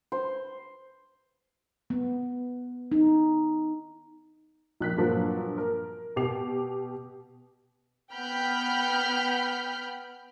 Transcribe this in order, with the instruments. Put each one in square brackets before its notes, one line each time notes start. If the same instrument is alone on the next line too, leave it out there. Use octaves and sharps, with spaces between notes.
[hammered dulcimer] C5
[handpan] B3
D#4
[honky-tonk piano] A#1 F#6 B6
G2 A#2 F3 F#3
A#4
B2 G4 D6 C7 F7
[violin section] B3 F#5 G5 B5 F6 G6